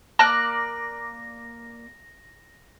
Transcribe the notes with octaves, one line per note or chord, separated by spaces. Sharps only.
A#3 D5 A5 F#6 A#6